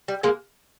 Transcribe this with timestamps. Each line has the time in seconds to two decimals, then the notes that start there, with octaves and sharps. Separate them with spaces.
0.08 G3
0.23 G#3 A#3